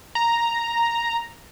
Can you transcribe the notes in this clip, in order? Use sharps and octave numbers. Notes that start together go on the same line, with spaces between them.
A#5